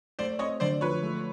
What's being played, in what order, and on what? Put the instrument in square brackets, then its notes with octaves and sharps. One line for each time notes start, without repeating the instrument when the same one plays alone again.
[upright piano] A3 [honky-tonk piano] C5 D5
[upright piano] C4 [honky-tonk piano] C#5 D#5
[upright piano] D3 [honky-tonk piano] C5 D5
[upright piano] F3 [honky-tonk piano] B4 C#5
[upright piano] A3